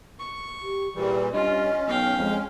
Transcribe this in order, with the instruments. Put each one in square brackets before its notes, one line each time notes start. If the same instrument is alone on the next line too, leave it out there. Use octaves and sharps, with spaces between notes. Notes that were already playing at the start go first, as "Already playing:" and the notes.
[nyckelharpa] C#6
[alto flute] G4
[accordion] A#2 E3 G3 [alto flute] G#4
[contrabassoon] G2 [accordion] C#4 [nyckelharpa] F4 [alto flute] D#5
[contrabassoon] B1 [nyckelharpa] F5 G5
[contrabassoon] F2 [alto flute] G#3